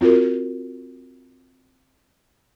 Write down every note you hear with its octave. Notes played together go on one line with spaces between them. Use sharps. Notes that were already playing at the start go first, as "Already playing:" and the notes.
C4 F4 F#4 A#4